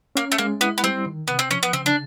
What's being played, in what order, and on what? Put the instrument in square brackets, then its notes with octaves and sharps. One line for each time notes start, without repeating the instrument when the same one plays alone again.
[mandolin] A#3 [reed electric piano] C#4
[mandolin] A3
[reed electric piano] G#3 [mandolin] A#3
[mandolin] B3 [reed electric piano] E4
[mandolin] B3
[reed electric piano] G3 [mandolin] C4
[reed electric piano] D#3
[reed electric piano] C3 [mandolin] B3
[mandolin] C4
[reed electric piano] F3 [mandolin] C#4
[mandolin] B3
[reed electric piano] C#3 [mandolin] C4
[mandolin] D4